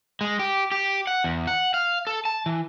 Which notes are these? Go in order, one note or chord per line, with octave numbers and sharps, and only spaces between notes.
G#3
G4
G4
F#5
E2
F#5
F5
A4
A5
E3